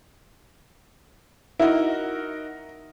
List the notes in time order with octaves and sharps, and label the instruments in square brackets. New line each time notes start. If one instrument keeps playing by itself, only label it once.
[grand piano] D#4 F#4 A#4 [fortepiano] E4